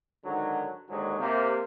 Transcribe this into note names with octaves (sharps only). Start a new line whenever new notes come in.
G#2 D3 D#3 F#3
D#2 G#2 D3 F#3 G#3
C3 A#3